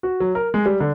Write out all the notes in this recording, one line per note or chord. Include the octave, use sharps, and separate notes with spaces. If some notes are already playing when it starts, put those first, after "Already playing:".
F#4
F#3
A#4
G#3
G3
D3